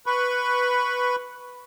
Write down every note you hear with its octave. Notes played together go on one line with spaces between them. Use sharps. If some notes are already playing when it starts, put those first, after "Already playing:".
B4 B5 C#6